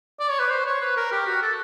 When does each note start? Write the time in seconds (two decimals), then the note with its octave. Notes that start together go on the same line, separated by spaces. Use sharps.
0.20 D5
0.30 C#5
0.40 B4
0.50 C5
0.66 C#5
0.81 B4
0.97 A#4
1.12 G4
1.27 F#4
1.42 A4